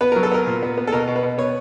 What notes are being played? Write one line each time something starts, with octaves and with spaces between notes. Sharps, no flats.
B3 B4
F#3 A#4
A4
B3 A#4
A#2
B3
B3
A4
B2 A#4
B2
B4
B2
B3 C#5